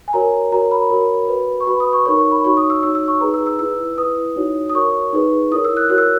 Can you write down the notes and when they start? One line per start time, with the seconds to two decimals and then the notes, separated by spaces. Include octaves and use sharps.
0.08 G#5
0.13 F#4 A#4 C#5 A#5
0.52 F#4 A#4 C#5 A#5
0.71 B5
0.90 F#4 A#4 C#5
1.29 F#4 B4
1.60 C#6
1.67 F#4 B4 B5
1.80 D#6
1.93 C#6
2.05 D#4 A#4 C#5 C#6
2.18 C#6
2.31 B5
2.44 D#4 F#4 C#5 C#6
2.57 D#6
2.70 E6
2.83 D#4 F#4 C#5 E6
2.95 E6
3.08 C#6
3.21 D#4 G#4 B4 A#5
3.34 E6
3.47 E6
3.59 E4 B4 E6
3.98 E4 B4 D#6
4.36 D#4 F#4 C#5
4.69 D#6
4.74 F#4 A#4 C#5 C#6
5.13 D#4 G#4 B4
5.52 E4 A#4 C#5 D#6
5.64 E6
5.77 F#6
5.90 F#4 A#4 C#5 F#6
5.98 E6